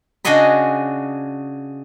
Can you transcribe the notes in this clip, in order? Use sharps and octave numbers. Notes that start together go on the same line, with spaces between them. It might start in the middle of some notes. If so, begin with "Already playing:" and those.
C#3 D4 F#4 G#4 D#5 B5